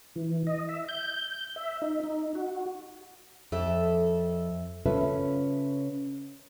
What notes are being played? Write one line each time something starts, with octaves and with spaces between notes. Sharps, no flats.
E3
D#5
E5
G6
E5
D#4
D#4
F#4
F2 A4 E5
C#3 C#4 F4 A4 B4 E5